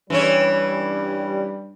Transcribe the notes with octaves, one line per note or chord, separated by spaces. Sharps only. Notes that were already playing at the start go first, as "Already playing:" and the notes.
G2 E3 G3 C#4 C#5